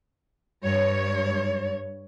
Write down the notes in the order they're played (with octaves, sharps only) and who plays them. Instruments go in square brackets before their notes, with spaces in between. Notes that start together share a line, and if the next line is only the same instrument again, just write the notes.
[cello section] G2 C#5